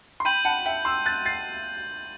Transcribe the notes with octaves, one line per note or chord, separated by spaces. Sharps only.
C6
G5 B5 G6 D#7 F#7
F#5 A5
E5 G5
C6 E6
F#6 A6
A6 C7